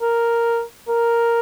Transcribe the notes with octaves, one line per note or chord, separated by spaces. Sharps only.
A#4
A#4